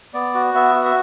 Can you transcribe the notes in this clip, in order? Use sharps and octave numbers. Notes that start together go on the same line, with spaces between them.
B3 D5
F#4
B3 E5
F#4
E5